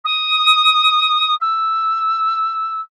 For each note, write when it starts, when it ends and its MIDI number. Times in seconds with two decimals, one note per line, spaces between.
0.04 1.34 87
1.41 2.80 88